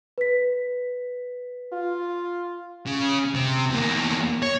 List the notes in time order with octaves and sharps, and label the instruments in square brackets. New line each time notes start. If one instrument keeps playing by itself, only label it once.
[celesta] B4 B6
[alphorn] F4
[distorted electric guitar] C#3
C3
E2 A#3
C#5